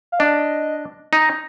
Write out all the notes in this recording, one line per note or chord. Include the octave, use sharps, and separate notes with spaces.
F5
D4 D#5
D#4